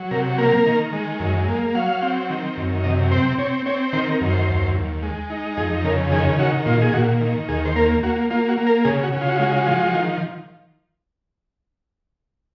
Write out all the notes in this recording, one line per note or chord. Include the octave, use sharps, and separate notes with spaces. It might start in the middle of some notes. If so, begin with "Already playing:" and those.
Already playing: F#3
C3 A#4
A#3 A#4
D#3
G#3
F#2
A#3
F#3 F5
C4
D#3
F#2
C3 D#5
C4 C5
C4 C#5
C4 C#5
D#3 C5
A#4
F#2
C5
D#2
D#2
G#3
D#4
F2 G#4
C#3 A#4
D#3 G#4
D#3 F#4
A#2 F4
G#4
A#2 F#4
D#3
D#2 G#4
C5
A#3 A#4
A#3 F#4
A#3 F4
F#4
A#3
A#4
C#3 G#4
F#4
C#3
F4
F#4
F4
G#3 F#4
F4
F#4
F3 F4
F#4
F4
F#4
D#3 F4